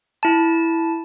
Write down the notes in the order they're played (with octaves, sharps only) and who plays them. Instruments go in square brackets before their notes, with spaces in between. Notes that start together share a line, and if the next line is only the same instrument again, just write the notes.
[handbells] E4 A5